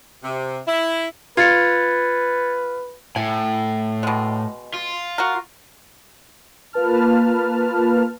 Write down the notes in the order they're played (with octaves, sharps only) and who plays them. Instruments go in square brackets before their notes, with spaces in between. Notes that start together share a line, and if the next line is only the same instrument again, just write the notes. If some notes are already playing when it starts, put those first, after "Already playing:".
[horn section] C3
E4
[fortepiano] F4 [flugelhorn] B4 [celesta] G#6 A6 C#7
[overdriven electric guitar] A2 [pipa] G#5
[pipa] B2 G#3
[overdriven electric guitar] F4
[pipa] F#4 A#4
[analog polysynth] A#3 F4 B4 A5 F6